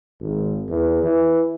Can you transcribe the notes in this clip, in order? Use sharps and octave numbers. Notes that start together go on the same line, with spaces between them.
G#1
E2
E3